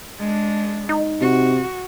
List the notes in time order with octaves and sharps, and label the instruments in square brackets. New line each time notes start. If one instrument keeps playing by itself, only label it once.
[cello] G#3 D4
[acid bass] D#4
[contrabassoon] C3 [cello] F#4